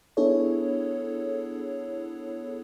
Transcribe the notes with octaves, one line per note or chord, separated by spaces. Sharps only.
B3 D4 E4 G#4 A4 C#5